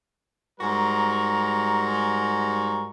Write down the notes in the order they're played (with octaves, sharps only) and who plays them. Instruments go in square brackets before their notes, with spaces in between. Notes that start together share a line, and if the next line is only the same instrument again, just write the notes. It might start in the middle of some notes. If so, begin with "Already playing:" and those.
[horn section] G#2 G3 F#4 A#4 A#5